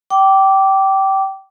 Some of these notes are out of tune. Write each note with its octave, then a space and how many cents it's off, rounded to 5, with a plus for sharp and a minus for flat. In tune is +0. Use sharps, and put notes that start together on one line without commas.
G5 -20 D6 -10